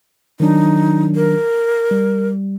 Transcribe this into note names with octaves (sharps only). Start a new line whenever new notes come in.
D#3 F#3 D4 D#4
A#4
G3